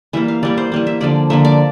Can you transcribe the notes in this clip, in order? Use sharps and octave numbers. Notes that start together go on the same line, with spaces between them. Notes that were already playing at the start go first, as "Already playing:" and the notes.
E3 G3 A#3 E5
F5
E3 G3 A#3 D5
C5
E3 G3 A#3
E5
D3 F3 A#3 D5
D3 F3 A#3 E5
D5